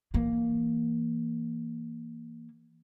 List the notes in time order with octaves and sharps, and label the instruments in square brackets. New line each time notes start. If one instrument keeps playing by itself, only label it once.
[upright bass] E3 A#3